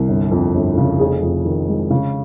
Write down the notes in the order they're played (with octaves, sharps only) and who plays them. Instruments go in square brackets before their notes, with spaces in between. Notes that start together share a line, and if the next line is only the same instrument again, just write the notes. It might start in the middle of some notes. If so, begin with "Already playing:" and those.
Already playing: [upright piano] C2
G1
F2
G1
C#3
F1 G#4
F2
D#3
G#3
C#3